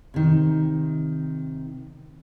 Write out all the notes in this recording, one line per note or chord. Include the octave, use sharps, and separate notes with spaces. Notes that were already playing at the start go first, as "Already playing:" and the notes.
C3 D#3